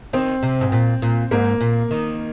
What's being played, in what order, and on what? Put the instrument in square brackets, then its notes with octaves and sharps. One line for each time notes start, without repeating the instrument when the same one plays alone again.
[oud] D#3 [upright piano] C4
[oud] C3
G#2
A#2
A#2
[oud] G#2 [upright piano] A#3
[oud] A#2
D#3